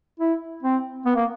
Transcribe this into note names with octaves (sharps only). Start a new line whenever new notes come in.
E4
C4
B3
A#3